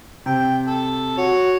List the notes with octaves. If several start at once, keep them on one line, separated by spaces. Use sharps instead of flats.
C3 G5
A4
F#4 C#5